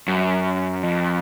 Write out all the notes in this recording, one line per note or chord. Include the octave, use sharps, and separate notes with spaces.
F#2
F2